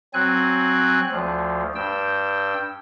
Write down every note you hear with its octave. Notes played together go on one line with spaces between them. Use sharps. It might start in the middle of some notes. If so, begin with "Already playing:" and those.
F#3 C4 G#5 F#6
D2 F3
G2 G5 E6